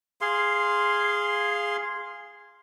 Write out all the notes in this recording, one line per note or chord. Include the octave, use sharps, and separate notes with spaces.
G#4 F5 C6